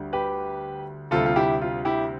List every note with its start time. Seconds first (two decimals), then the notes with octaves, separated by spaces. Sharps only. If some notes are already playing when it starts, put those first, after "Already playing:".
Already playing: D2 D3 G3
0.13 G4 B4
1.11 D2 C3 G3 F4 A4
1.26 F4
1.36 E4 G4
1.62 F4
1.85 E4 G4